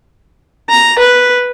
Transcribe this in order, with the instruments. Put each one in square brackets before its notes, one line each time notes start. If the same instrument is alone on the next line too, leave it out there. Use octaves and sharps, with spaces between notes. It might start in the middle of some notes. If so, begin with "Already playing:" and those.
[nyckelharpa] A#5
B4